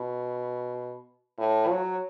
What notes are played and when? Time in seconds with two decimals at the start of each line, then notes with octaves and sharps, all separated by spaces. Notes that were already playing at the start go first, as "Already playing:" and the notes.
Already playing: B2
1.39 A2
1.70 F#3